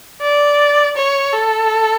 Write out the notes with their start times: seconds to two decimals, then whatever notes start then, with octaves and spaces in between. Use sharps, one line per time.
0.22 D5
0.97 C#5
1.33 A4